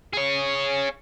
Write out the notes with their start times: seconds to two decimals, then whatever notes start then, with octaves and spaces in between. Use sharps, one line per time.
0.13 G#4 C#5